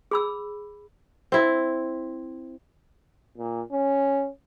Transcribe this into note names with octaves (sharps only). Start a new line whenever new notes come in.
G#4 B5 E6
C4 E4
A#2
C#4